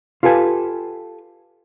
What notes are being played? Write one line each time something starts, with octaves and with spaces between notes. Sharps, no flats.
F4 G4 A4 B4 G#5